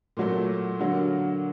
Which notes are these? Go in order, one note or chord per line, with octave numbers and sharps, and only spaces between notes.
A#2 F#3 A3
D3 F#3 A#3